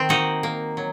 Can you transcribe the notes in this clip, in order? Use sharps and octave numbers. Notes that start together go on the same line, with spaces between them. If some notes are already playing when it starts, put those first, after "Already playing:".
Already playing: D#3 C4
A#3 D#4 F#4
A#3
F#3